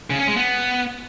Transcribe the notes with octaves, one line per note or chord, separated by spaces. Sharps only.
C#3
C#4
G#3
B3